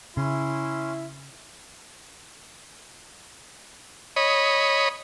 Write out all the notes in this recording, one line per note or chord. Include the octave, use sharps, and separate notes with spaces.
C#3 C#4 E4 C6
C#5 D#5 B5